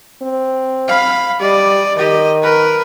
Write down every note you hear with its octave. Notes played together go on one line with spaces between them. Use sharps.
C4
F5 B5
G3 D5 D#5
D#3 G4 D#5
A#4 B4